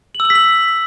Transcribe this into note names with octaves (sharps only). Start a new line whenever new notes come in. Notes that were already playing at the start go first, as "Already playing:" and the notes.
F#7
E6
F#7
B6
F#7